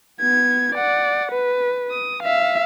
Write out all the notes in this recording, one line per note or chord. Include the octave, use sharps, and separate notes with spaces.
B3 G#6
D5 F#5
B4
D#6
E5 F5